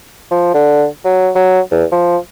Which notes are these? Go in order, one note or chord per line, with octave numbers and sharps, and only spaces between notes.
F3
D3
F#3
F#3
E2
F3